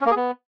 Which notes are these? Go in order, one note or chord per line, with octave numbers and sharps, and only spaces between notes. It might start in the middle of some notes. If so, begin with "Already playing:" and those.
C#4
A#3
G#4
B3